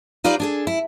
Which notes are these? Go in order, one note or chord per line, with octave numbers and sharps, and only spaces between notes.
D#4 F4 G4 B4 C5 D5
D4 G#4 A4
E4